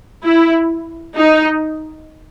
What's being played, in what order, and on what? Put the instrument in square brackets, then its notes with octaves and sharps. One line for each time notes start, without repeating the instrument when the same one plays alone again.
[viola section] E4
D#4